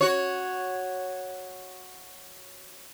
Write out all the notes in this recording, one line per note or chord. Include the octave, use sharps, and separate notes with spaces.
F#4 C#5